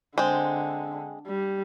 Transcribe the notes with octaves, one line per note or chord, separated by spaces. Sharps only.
D3 G#3 C4
G3